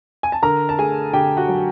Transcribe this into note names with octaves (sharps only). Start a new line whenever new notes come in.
G#5
A5
D3 A#4 A#5
A5
A3 G#4 G#5
D3 G4 G5
F#4 F#5
F#3